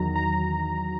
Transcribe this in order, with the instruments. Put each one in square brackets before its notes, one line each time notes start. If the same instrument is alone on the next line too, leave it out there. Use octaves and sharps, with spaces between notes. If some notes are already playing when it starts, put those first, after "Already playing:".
Already playing: [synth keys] E2 D#3 F#3 A#5
A#5